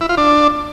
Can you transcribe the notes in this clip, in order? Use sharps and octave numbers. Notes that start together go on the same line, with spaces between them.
E4
F4
D4